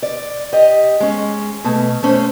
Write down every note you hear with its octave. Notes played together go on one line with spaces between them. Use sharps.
D5
G4 D#5
G#3 C#4
B2 A3
A3 C#4 C5